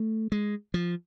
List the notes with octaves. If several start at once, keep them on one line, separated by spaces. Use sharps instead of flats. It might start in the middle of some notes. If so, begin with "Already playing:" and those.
Already playing: A3
G#3
F3